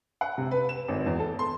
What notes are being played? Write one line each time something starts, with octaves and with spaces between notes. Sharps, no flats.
F#5
C3
B4
E7
G#1
E2
A4
C6